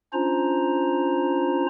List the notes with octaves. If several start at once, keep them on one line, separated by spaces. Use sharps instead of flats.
C#4 D4 F4 C5 A#5